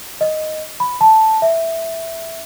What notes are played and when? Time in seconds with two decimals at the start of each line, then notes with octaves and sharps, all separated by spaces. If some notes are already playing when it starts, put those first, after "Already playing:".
0.21 D#5
0.80 B5
1.01 A5
1.42 E5